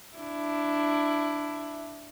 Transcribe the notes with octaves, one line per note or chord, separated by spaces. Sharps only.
D4 E4